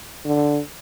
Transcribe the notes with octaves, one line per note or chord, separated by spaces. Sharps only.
D3